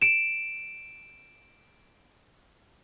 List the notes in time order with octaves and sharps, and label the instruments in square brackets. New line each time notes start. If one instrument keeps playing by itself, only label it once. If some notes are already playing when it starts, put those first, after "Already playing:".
[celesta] D7 E7